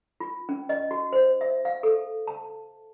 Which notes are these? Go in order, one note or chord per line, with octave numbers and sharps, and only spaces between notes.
F4
C#4
D#5
F#4
C5
E5
F5
A4
A5